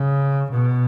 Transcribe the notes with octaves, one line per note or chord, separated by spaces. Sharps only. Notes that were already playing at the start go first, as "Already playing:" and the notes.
Already playing: C#3
B2